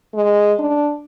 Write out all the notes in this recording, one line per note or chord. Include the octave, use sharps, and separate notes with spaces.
G#3
D4